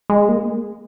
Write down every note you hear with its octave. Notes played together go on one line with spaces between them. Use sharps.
G#3
A#3